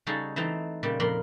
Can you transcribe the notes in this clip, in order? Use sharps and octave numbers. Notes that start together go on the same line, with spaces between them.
C#3 G3 D#4 F#4 G#4 A4
E3 A3 C4 D#4
A#2 C#3 G3
F2 A#2 A#4 B5 C6